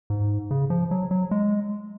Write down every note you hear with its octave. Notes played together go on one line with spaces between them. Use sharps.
G#2
C#3
F3
F#3
F#3
G#3